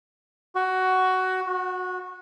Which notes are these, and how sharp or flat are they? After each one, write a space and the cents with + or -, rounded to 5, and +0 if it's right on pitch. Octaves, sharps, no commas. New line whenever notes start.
F#4 +15
F#4 -20